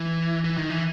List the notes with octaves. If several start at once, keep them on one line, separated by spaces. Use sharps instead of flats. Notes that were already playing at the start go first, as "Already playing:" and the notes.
Already playing: E3
E3
D#3
E3